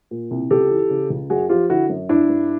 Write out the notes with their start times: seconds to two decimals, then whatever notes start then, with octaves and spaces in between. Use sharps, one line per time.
0.11 A#2
0.31 C2
0.51 C#2 G4 A4
0.70 E3
0.90 C#3
1.10 C#2
1.30 F#2 F#4 G#4
1.49 F3 F4 G4
1.70 D3 E4 F#4
1.89 F#2
2.09 G2 D4 E4
2.29 G2